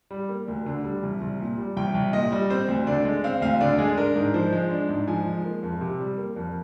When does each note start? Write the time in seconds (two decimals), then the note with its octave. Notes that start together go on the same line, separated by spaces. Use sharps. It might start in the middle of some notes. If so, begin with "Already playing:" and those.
0.11 G3
0.29 A#3
0.48 D2
0.66 D3
0.84 G3
1.03 C2
1.21 C2
1.40 A#2
1.58 G3
1.76 C2 G5
1.94 C2
2.13 A#2 D#5
2.32 G3
2.50 C4 C5
2.68 D2
2.87 D3 D5
3.05 G#3
3.24 C4 F5
3.41 D2 F5
3.61 D3 D5
3.78 G#3 G#4
3.97 D4 A#4
4.16 G#2
4.34 F3 C5
4.53 G#3
4.71 D4
4.89 G#2
5.08 F3 G#5
5.26 G#3
5.45 A#3
5.63 F2
5.81 C3
6.00 G3
6.18 A#3
6.36 F2